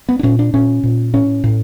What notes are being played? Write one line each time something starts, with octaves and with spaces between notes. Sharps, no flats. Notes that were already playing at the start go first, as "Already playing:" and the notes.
B3
D4
A#2 C#4
D4
A#2 C#4
A#2
A2 C#4
A2